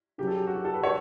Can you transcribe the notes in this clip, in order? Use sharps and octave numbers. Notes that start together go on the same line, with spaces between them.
C#3 F#3 C#4 G4
A4
G4
F#4
G4
A4
B4
C#5